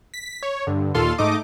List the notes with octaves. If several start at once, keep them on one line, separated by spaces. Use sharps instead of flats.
B6
C#5
G2 D3
D#2 A#2 F4 A4 F5 C6
G#2 A3 D#4 D#5 D6